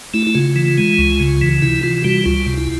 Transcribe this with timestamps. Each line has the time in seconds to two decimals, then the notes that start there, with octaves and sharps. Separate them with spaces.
0.14 A3 E4
0.27 E4
0.35 C#3 F4
0.56 E3
0.78 G#3
0.98 C#2
1.20 C#3
1.42 E3
1.62 C3 E4
1.83 E3 F4
2.04 G3 F#4
2.26 C#2 F4
2.47 C3
2.57 E4